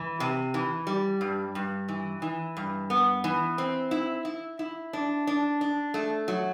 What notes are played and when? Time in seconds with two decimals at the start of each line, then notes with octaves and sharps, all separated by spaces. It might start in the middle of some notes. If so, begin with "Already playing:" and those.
Already playing: E3
0.20 C3
0.54 E3
0.87 G3
1.21 G2
1.55 G2
1.88 E3
2.22 E3
2.57 G2
2.90 B3
3.24 E3
3.58 C4
3.91 E4
4.25 E4
4.59 E4
4.93 D4
5.27 D4
5.61 D4
5.94 A3
6.28 F#3